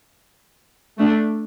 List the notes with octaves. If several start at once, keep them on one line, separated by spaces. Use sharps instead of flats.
A3 D4